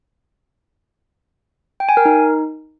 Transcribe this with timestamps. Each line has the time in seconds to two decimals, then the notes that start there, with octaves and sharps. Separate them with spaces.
1.80 G5
1.89 G#5
1.97 A#4
2.05 D#4